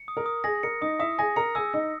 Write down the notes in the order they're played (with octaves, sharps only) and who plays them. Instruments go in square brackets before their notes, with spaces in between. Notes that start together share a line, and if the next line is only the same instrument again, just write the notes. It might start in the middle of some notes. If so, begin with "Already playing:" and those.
Already playing: [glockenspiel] C#7
D#6
[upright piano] A#4
[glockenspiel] D#6
[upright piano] G#4 [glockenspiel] A#6
[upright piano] A#4 [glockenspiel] C#7
[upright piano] D#4 D#5 [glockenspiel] D#6
[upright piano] E4 E5 [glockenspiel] D#6
[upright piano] G#4 G#5 [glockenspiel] A#6
[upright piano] A#4 A#5 [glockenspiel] C#7
[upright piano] G#4 G#5 [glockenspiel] E6
[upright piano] D#4 D#5 [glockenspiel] E6